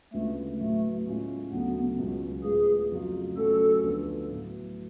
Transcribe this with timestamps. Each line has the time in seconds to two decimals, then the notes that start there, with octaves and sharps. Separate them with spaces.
0.13 D2 C#3 G#3 A3 B3 F4
0.59 A2 F#3 A3 B3
1.05 A2 G#3 C#4 F4
1.52 D2 C#3 F#3 A3 B3
1.98 C#2 B2 F#3 C#4 F4
2.44 A2 G#3 B3 F4 G#4
2.90 F2 C#3 F#3 A3 F4
3.37 B2 F#3 A3 C#4 F4 A4
3.83 D2 D3 F3 B3
4.29 A2 F#3 B3